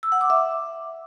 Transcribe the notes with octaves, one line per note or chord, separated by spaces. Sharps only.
E6
F#5
D6
E5